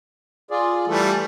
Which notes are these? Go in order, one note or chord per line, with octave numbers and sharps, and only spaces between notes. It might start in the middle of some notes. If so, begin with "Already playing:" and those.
F4 G#4 D5
E3 G3 A3 A4